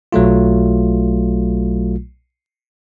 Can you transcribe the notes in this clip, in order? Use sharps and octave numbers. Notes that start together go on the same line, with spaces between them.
B1 F#3 A3 F4